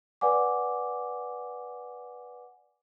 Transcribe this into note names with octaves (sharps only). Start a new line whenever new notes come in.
B4 D5 F#5 G#5 D6